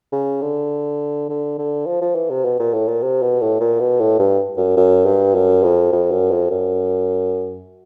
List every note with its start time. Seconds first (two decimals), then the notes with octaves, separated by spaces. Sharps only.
0.13 C#3
0.42 D3
1.29 D3
1.58 D3
1.86 F3
2.01 F3
2.15 E3
2.30 C3
2.45 B2
2.60 A#2
2.74 A2
2.88 A#2
3.02 C3
3.23 B2
3.41 A2
3.61 A#2
3.80 B2
3.99 A2
4.19 G2
4.57 F#2
4.77 F#2
5.06 G2
5.35 F#2
5.63 F2
5.92 F2
6.12 F#2
6.31 F2
6.51 F#2